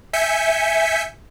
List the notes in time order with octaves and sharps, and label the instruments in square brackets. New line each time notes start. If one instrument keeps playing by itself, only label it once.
[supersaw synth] E5 G#5 G6 B6 C#7